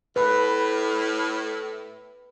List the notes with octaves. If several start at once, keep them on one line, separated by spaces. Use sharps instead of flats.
A2 B4